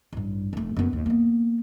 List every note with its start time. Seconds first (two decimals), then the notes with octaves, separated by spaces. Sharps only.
0.13 A1 G2
0.53 F1 A3
0.77 F#2 B3
0.93 D#2
1.06 A#3 B3